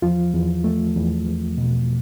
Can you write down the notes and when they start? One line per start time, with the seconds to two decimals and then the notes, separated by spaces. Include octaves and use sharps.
0.02 E2 F3 F4
0.34 E2
0.64 A3
0.96 E2
1.27 E2
1.57 B2